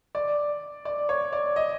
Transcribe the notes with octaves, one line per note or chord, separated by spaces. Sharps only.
D5
D5
C#5
D5
D#5